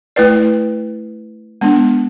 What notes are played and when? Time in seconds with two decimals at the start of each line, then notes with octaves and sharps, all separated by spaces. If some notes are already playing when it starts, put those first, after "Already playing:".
0.16 A3 E4 B4 D5
1.61 G#3 B3 D4